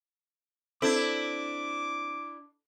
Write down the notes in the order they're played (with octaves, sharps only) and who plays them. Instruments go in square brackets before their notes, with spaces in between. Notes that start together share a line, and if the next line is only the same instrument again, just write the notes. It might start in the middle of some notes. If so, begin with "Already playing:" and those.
[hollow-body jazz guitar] C4 [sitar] D4 E4 [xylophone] A4 [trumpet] D6